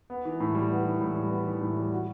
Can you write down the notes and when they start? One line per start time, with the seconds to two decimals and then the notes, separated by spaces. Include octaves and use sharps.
0.10 B3
0.25 E3
0.40 A2
0.55 G3
0.71 B3
0.85 E3
1.01 A2
1.16 G3
1.30 B3
1.46 E3
1.61 A2
1.77 G3
1.92 F#4